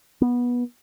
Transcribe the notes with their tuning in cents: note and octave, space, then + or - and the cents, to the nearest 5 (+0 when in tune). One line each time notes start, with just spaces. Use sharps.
B3 -20